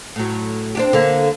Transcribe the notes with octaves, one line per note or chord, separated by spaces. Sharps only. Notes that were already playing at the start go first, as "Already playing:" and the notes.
A2 F#3
C4 D4 G4
D3 A#3